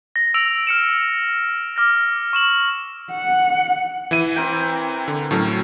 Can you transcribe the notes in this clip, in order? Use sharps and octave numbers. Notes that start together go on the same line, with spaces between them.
A#6
E6 D7 F7
F6 C#7 E7
D6 F6 A#6
C#6 E7 F#7
F#5
E3 E4 D#7
C4 A#4 G5
D3
A2 F#3 A3 C#4